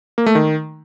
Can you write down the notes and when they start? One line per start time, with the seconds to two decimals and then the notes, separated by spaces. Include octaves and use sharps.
0.18 A#3
0.26 A3
0.35 D#3